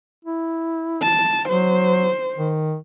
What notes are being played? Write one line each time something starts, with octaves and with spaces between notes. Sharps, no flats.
E4
A5
F#3 C5
D#3